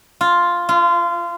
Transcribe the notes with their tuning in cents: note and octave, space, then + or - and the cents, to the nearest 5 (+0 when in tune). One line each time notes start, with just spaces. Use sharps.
F4 +0
F4 -25